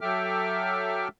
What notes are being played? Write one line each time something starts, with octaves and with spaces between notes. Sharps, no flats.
F#3 A4 E5 G5 D6 F6